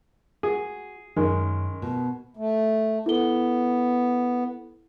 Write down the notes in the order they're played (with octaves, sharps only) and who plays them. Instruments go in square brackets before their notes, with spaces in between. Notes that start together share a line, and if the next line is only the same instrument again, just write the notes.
[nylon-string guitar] F#4 [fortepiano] G#4
[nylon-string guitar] F#2 [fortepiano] D#3 G#3
[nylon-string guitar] B2
[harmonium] A3
[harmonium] B3 [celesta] E4 A4 G7